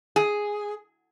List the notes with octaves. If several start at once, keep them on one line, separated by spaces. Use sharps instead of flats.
G#4